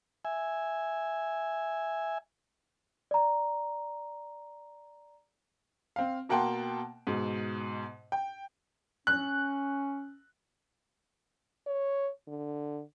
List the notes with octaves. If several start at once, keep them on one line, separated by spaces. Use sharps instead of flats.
E5 G#5
D5 A#5
C4 F5
B2 A#3 F#5 G5 A5 C6
G#2 B2
G5
C#4 F#6
C#5
D3